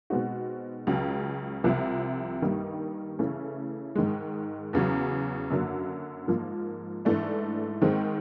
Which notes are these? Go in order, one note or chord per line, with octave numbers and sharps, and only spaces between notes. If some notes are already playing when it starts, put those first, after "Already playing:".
B2 G#3 C4 D#4 F#4
C#2 C#3 F#3
C2 C3 F3
G2 D#3 G3 A#3 D#4
C#3 E3 A3 C#4
G#2 D#3 G#3
E2 C#3 F#3
F#2 D3 F#3 A#3
G#2 F3 A#3
G#2 E3 A3 D4
G#2 D#3 G#3 C4